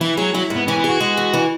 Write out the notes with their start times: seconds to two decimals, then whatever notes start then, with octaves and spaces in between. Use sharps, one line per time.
0.01 E3 E4
0.17 F#3 G#4
0.34 F#3 E4
0.50 G#2
0.56 B3
0.67 E3 C#4
0.79 B3
0.84 F#4 G#4
1.01 G#3
1.17 E3
1.34 E3